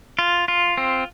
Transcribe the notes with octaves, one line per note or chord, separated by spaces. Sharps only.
F4
F4
C4